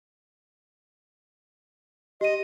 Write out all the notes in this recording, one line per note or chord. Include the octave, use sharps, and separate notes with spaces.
G4 D#5 D#7